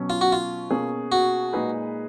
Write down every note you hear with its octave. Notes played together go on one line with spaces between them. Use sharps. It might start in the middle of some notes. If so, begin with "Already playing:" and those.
Already playing: B2 F#3 C#4
F4
F#4
F4
B2 A#3 C#4 G#4
F#4
A#2 G#3 D#4 G#4 B4